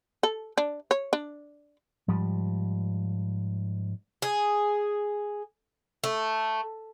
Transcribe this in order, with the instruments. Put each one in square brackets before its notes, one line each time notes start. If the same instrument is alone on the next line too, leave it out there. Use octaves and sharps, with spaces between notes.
[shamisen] A4
D4
C#5
D4
[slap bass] G#2 F3 G3
[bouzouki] G#4
A3